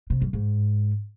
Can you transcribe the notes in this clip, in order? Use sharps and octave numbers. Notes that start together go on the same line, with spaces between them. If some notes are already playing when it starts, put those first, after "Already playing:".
C3
F#2
G#2